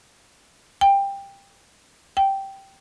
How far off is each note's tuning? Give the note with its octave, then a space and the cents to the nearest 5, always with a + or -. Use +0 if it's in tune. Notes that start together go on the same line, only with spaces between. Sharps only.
G5 +15
G5 -10